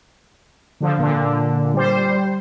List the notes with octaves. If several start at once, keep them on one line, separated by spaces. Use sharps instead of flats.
D3 F3
A#2 D3
G3 C5